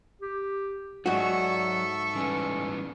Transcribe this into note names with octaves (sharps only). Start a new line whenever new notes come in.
G4
G#2 F#3 F#4 A4 D5 E5 C#6
E3 G3 B3 C#4